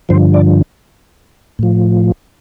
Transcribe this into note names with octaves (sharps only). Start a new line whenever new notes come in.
G2 D3 F3 C5
D5
A2 F3